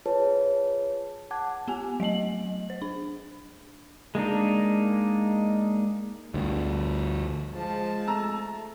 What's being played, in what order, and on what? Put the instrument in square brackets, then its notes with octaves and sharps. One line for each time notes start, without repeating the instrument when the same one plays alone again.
[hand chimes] F4 G#4 B4 C#5 A5
F#5 A5 D6 F#6 G#6
[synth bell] B3 G4 G#5
F#3 A3 D#5 F#7
C5
D4
[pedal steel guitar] G#3 A#3 D4 D#4
[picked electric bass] D2 G2
[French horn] F3 [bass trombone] G#3 [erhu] A5
[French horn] A3 [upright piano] A#5 E6